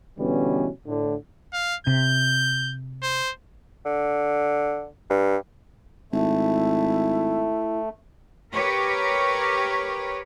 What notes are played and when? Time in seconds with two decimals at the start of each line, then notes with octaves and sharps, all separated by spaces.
0.18 B2 D3 E3 G3 B3 C#4
0.86 A2 D3
1.53 F5
1.87 C3 G6
3.03 C5
3.86 D3
5.10 G2
6.13 G#1 A3 E4
8.53 G4 A#4 B4 C#5